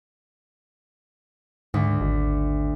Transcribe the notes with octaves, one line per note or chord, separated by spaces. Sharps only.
D2 G#2
G#1